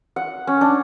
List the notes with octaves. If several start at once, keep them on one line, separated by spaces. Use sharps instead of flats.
F#5
C#4
D4